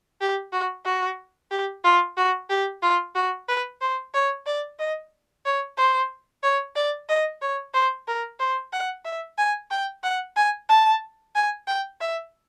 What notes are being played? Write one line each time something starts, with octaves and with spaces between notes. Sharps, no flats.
G4
F#4
F#4
G4
F4
F#4
G4
F4
F#4
B4
C5
C#5
D5
D#5
C#5
C5
C#5
D5
D#5
C#5
C5
A#4
C5
F#5
E5
G#5
G5
F#5
G#5
A5
G#5
G5
E5